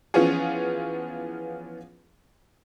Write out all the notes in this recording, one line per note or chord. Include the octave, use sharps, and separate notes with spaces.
E3 F3 B3 C#4 F4 G#4